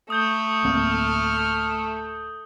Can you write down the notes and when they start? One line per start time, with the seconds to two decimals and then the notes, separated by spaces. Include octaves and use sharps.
0.10 A3 D#6 G6 G7
0.65 D1 A#3 C4 F6